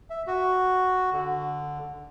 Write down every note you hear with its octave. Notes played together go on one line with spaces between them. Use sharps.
E5
F#4
D3